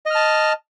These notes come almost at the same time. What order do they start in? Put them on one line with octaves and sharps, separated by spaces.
D#5 F6 A5